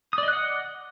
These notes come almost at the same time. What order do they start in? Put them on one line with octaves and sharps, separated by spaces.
D#6 D5 D#5 F#6 F#5